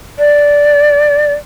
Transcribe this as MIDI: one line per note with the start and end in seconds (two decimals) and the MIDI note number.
0.18 1.33 74